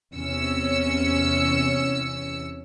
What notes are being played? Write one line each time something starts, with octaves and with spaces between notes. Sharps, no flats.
E2 C3 C#4 E6 C#7